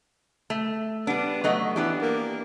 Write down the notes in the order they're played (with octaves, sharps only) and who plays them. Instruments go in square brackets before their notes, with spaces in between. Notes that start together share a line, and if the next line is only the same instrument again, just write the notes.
[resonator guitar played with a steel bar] A3
[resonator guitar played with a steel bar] G3 D4 [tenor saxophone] B3
[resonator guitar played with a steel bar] F#3 A3 D#5
[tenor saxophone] E3 [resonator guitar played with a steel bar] B3 D4 G4
[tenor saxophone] A#3